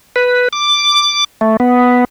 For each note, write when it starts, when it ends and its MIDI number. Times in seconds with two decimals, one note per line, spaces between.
0.16 0.48 71
0.53 1.24 86
1.41 1.57 57
1.60 2.05 59